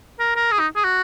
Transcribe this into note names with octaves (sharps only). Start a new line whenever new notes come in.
A#4
A#4
G#4
D#4
G#4
F#4